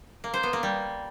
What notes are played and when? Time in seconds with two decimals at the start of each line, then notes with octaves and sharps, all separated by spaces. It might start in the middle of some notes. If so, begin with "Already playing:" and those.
0.24 A#3
0.34 C5
0.43 B3
0.53 A#3
0.63 G3